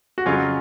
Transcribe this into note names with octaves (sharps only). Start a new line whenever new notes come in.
F#4
F2 C#3 F#3 C#4 F4